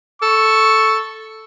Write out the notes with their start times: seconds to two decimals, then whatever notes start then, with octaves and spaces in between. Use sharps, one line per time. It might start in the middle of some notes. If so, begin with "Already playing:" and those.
0.22 A4 C#6